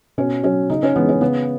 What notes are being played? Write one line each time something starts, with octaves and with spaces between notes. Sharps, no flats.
B2 C#4
F#3 C#4
C#3 D#4
C#4
E3 G#3 B3
C#4
C#3 B3